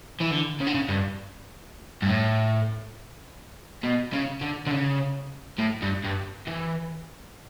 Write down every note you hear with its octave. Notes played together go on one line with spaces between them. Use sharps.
E3
D3
C#3
D3
C#3
G2
G2
A2
B2
C#3
D3
D3
C#3
A2
G2
G2
E3